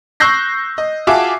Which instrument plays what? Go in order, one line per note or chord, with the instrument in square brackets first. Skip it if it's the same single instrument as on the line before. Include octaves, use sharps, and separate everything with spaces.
[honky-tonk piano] C#6 E6 F#6 G6 A#6 C7
D#5
F4 F#4 G#4 E5 A5 D6